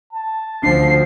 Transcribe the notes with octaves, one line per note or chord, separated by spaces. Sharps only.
A5
D2 F3 D4 C7